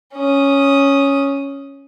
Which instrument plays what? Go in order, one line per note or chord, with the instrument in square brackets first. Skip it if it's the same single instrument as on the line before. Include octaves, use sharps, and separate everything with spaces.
[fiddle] C#4 D#6